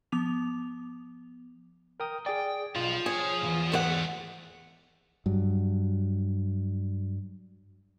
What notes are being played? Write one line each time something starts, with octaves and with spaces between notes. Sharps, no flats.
F3 B3 D6 F7
A#4 G5 D#6
G#4 D5 G5
B1 F3 F4
G#4 C#5
B1 E2
G#2 A3 G4 C5 F#5
G2 F#3